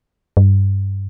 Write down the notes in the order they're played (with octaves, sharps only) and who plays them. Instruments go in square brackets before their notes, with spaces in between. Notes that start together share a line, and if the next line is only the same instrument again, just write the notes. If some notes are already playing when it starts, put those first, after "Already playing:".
[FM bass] G2